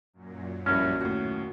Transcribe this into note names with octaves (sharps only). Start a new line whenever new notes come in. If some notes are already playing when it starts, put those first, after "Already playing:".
F#2 A#2 F#3
A#1 G2 C#4 E4 F#4 A#4
D#2 A2 F#4